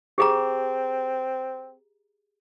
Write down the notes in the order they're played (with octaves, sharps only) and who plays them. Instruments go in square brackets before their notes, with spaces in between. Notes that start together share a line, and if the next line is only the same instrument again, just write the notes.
[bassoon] C4 [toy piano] G4 G#4 A#5